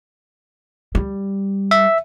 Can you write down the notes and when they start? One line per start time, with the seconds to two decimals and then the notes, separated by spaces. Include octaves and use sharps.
0.95 G3
1.71 E5